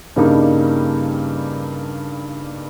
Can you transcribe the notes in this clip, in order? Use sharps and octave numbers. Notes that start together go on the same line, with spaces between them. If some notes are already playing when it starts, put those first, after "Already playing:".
G2 C#3 G3 A#3 D4 D#4